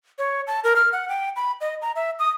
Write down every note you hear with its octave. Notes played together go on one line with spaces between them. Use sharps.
C#5
A5
A#4
F6
F#5
G5
B5
D#5
A#5
E5
D#6